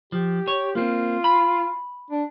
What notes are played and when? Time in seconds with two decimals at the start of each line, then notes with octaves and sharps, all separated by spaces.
0.12 F3 G4
0.48 C#5
0.75 A#3 C4 F4
1.24 B5
2.10 D4